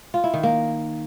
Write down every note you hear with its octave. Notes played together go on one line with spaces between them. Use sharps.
F4
E4
D#3
A#3